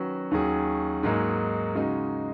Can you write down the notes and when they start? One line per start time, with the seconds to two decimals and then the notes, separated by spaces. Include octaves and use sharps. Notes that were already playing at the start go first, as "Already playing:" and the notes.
Already playing: D#3 F#3 C#4 F#4 B4
0.31 D#2 D#3 F#3 C#4 G#4
1.03 G#2 F#3 A#3 D#4 G#4
1.75 C#3 G#3 D#4 F#4